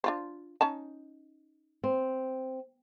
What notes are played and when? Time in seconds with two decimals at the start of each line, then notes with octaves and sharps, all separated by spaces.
0.04 D4 F4 C5
0.61 C#4 D#4 A5
1.84 C4